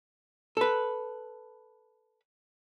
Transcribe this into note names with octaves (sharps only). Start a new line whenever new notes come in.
A4 B4